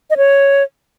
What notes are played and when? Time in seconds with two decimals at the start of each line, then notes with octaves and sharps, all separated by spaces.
0.10 D#5
0.17 C#5